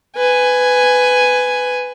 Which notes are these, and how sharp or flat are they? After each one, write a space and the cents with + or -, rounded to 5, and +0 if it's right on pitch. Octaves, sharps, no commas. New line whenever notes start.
B4 +15 G#5 +0